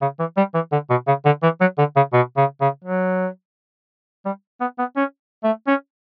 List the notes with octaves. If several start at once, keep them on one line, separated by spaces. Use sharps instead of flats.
C#3
E3
G3
E3
D3
B2
C#3
D3
E3
F#3
D3
C#3
B2
C#3
C#3
F#3
G3
B3
B3
C#4
A3
C#4